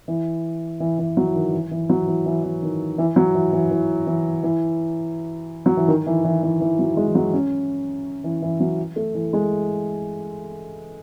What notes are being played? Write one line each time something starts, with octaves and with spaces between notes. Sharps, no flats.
E3
E3
E3
F#3
E3
D#3
E3
E3
F#3
E3
E3
E3
D#3
E3
F#3
E3
E3
E3
E3
E3
F#3
E3
D#3
E3
E3
E3
E3
F#3
G#3
E3
F#3
C#4
E3
E3
F#3
A3
E3
G#3